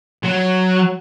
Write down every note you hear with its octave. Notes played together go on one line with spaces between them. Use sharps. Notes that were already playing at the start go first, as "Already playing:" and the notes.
F#3